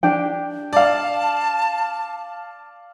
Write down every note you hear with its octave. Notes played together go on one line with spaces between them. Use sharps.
D4 G4 G5
D5 F5 A5